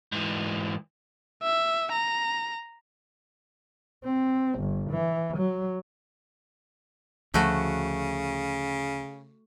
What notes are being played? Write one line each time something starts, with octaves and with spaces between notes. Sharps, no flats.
G#2 E3
E5
A#5
C4
G1
E3
F#3
D2 C#3 F3 A3 F#4